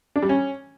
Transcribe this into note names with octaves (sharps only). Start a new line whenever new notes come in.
D4
G3
C#4